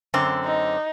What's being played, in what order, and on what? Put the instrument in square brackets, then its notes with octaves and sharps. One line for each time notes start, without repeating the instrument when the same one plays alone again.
[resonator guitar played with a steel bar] F#2 D3 C4
[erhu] D#4